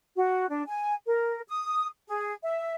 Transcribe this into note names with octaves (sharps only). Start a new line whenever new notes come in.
F#4
D4
G#5
A#4
D#6
G#4
E5